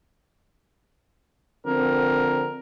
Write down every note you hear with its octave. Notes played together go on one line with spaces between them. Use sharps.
D3 F3 C4 A#4